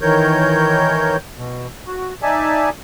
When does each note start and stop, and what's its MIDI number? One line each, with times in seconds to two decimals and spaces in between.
0.01 1.17 51
0.01 1.17 52
0.01 1.17 70
0.01 1.17 73
0.01 1.17 91
1.37 1.67 47
1.87 2.13 66
2.22 2.69 63
2.22 2.69 74
2.22 2.69 76
2.22 2.69 80
2.22 2.69 81